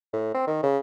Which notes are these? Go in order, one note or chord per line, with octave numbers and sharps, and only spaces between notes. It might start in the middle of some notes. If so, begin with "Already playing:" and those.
A2
C4
D#3
C#3